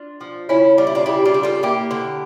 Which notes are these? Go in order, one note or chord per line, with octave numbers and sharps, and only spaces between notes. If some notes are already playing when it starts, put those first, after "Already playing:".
Already playing: D4 F4
F3
C#3 C#4 E4
G3 F4
E4
D4 F4
C#3 E4 G4
D4 F4
G3
F4 A4
A#3 E4 G4
D3